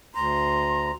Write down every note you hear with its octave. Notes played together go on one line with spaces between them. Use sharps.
D2 A#5 C6